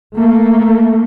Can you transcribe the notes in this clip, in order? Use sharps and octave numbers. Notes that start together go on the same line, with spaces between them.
A3 A#3